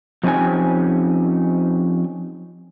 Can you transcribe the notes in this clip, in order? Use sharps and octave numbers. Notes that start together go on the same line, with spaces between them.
F3 C4 C#4 D#4 G4 G#5